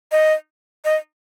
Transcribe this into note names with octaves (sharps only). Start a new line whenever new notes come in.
D#5
D#5